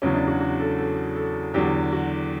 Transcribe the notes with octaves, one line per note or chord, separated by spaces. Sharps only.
E2 C#3 F#3 C#4
D4
F#4
F#4
A4
A4
A4
E2 D3 F#3 G4
F#4